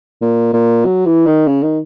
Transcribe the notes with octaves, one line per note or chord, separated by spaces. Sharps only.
A#2
A#2
F#3
E3
D#3
C#3
D#3